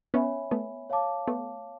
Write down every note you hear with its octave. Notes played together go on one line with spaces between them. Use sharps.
B3 C#4 C#5 E5 G#5 B5
A3 B3
C#5 F5 A5 D6
A3 B3